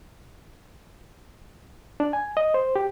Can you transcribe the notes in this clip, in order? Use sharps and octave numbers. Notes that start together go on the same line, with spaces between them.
D4
G#5
D#5
C5
G4